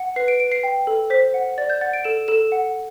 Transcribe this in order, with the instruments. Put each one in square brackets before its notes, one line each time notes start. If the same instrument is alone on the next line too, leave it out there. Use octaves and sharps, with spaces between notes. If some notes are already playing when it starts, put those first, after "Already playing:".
Already playing: [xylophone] F#5
B4 C7
D7
B4 D7
C7
G5
A4
C5 B6
F#5
D5 A6
G6
F#5 A6
D7
A4 E7
A4 E7
F#5